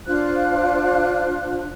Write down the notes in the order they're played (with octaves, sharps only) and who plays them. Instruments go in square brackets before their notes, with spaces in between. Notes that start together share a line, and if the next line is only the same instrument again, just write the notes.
[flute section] D4 F4 C5 F#6